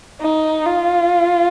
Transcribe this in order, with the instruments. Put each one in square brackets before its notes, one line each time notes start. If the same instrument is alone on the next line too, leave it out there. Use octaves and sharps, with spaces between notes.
[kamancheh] D#4
F4